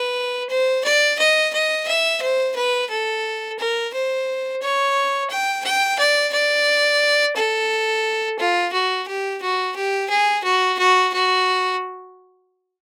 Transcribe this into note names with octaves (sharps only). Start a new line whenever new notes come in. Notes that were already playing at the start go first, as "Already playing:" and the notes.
Already playing: B4
C5
D5
D#5
D#5
E5
C5
B4
A4
A#4
C5
C#5
G5
G5
D5
D5
A4
F4
F#4
G4
F#4
G4
G#4
F#4
F#4
F#4